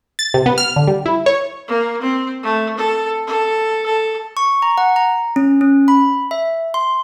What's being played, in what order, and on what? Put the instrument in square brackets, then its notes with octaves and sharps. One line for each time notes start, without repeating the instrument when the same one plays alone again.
[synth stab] A6
C3
B3
F6
D3
G3
E4
C#5
[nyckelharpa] A#3
C4
A3
A4
A4
A4
[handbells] C#6
A#5
F#5
A#5
C#4
C#4
B5
E5
C6